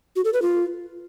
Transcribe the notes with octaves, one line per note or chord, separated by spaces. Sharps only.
F#4
A4
B4
F4